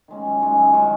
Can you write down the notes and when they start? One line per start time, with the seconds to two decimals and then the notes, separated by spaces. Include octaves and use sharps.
0.08 D#3 G#3 C#4
0.26 F#2
0.42 D#3 G#3 C#4
0.58 F#2
0.74 D#3 G#3 C#4